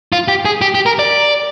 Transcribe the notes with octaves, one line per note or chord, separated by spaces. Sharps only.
F4
G4
G#4
G4
G4
A#4
D5